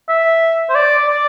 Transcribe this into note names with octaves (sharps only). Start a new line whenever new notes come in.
E5
C5
D5
D5